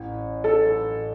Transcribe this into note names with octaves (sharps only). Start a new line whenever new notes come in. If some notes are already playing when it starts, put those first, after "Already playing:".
Already playing: A1
A4